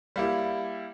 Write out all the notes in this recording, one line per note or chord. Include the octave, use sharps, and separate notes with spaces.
G3 A#3 E4